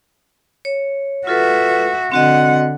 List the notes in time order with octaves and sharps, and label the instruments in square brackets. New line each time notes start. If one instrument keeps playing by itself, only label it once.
[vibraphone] C#5
[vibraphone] F4 A4 B4 [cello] F#4 E5
[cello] D3 F#5 [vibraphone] C4 F#4 D#5